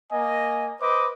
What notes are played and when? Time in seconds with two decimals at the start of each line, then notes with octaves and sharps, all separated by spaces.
0.12 A#3 D#5 G#5
0.81 B4 C5 D#5 D6